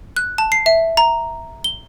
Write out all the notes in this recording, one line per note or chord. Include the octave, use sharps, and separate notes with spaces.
F#6
A5
C7
E5
A#5
G7